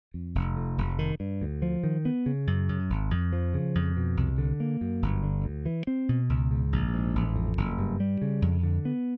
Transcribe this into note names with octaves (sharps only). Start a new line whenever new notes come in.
F2
F1
F2
F1
D#3
G2
D2
F3
D#3
B3
C#3
F#2
F#2
G#1
F2
F3
C#3
F2
B2
C2
D3
A#3
F#2
G1
D3
D2
E3
C4
B2
C#2
G#2
A#1
G#2
A1
F2
F#1
G2
G3
C#3
F2
D3
B3